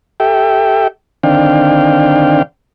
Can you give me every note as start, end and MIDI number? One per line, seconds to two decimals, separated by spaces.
0.20 0.88 67
0.20 0.88 69
0.20 0.88 76
0.20 0.88 79
1.23 2.42 50
1.23 2.42 51
1.23 2.42 60
1.23 2.42 62
1.23 2.42 77
1.23 2.42 79